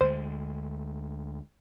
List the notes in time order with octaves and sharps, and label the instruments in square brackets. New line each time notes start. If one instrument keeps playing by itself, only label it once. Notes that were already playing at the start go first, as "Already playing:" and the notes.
[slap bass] D2 D3 G#3 [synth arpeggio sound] C5